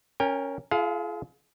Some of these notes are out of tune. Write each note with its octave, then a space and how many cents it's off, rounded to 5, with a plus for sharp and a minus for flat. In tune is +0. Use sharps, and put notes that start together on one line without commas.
C#4 +0 A#4 +0 G5 +35
F4 -35 G#4 +40 F5 +25